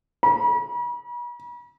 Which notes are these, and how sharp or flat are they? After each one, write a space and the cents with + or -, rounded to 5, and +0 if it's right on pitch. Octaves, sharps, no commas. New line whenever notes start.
B5 -45